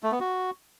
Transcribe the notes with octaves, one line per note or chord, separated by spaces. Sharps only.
A3
B3
F#4